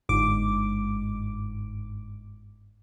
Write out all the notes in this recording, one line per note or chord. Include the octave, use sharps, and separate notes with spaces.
G1 G#2 D6